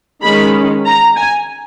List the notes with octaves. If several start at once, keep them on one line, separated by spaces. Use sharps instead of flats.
D#3 G#3 C#4 B5
A#5
G#5